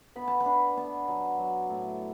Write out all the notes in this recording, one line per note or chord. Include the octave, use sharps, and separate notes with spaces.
B3 B5
A5
B5
D4
B3 A5
F#3
F#3
A2